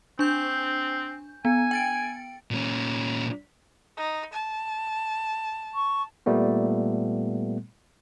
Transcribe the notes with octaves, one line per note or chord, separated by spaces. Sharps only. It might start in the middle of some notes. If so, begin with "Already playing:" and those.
C4 D4 G6
B3 G#5
G5 A6 D7
A#2 C#4
D#4
A5
C#6
A#2 G3 A3 B3